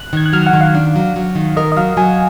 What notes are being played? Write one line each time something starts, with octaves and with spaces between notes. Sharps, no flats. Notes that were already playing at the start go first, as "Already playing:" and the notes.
Already playing: F#6
D#3 G#6
F#6
F#3 F6
F#5
D#3
F5
D4
F#3
F#3
D#3
A#4 D#5
D#5
F#3 F5
F#3 G#5